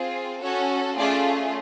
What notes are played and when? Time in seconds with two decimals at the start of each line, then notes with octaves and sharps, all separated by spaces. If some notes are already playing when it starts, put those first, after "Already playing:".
Already playing: C4 F4 G#4
0.42 C#4 F#4 A4 C#5
0.97 A3 C#4 F4 G#4 D5